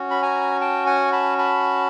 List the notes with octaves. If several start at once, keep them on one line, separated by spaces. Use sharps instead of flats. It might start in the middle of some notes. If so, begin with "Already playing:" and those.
Already playing: C#4 F#4
B5
G#5 A#5
G5 A5
F#5 G#5
A5 B5
A5 B5